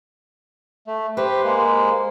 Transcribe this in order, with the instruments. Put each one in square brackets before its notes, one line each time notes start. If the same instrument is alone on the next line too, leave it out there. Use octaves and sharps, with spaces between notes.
[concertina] A3
[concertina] G4 B4 [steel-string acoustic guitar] C5
[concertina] G#3 A#3